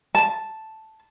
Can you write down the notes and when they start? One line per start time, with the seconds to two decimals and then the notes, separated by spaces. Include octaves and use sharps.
0.15 A5